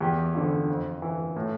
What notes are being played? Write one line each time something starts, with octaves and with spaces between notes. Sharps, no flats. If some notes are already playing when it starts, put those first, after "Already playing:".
E2 G4
D3 F3
F2
E3
A2